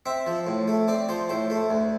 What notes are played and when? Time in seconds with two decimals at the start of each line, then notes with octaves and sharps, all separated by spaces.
0.06 C4 E5
0.27 F3
0.47 A2
0.68 A3
0.88 C4 D5
1.09 F3 C5
1.29 A2 C5
1.50 A3
1.70 D2